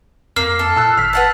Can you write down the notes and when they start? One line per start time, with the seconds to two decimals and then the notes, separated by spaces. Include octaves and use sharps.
0.36 F2 A#3 F6 C7
0.59 A4
0.76 A#2 A5 E6 F#6
0.97 G#1 F6 B6
1.13 B4 F#5 A5